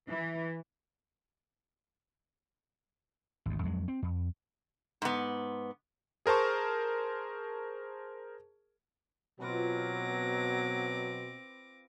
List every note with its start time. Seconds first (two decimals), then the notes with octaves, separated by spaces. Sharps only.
0.10 E3
3.46 G#1 D2
3.63 F2 F#3 G#3
3.88 C4
4.02 F2
5.02 G#2 B3
6.26 G#4 A#4 C5 A5 C#6
9.40 B2 F#3 C4 F4 B4 B5 D6 A#6